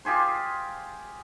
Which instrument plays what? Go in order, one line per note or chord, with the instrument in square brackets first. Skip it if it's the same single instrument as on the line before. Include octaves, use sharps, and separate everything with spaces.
[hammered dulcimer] F4 G4 G#4 C5